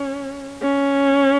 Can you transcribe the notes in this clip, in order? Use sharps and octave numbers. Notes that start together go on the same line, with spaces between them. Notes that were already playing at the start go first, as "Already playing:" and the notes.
Already playing: C#4
C#4